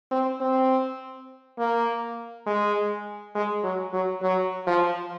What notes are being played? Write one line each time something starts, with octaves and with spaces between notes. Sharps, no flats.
C4
C4
A#3
G#3
G#3
F#3
F#3
F#3
F3